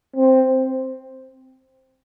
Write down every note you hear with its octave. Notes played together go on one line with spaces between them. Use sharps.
C4